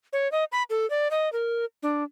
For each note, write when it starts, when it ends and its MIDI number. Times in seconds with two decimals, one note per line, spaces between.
0.13 0.31 73
0.32 0.44 75
0.52 0.63 83
0.70 0.88 69
0.90 1.11 74
1.11 1.32 75
1.33 1.65 70
1.83 2.03 62